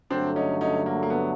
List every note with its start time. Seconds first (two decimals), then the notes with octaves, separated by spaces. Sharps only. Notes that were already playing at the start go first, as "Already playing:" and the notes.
0.10 G2 D3 F#3 A3 C4 D4
0.36 C#4 D#4
0.61 C#4 D#4
0.86 A#3
1.03 A#3
1.10 B3